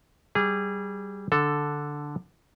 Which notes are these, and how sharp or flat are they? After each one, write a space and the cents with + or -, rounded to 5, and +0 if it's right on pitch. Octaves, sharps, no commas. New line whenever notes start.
G3 -15 G#4 -20
D3 +0 A4 +0